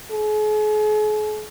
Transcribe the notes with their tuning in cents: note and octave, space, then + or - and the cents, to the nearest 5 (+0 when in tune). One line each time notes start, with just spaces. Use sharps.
G#4 +45